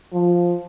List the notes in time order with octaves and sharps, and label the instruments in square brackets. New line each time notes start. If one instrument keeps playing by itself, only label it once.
[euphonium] F3